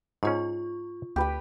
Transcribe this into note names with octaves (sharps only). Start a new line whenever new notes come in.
G#2 C#4 F4 C#6
D2 G4 B4 G5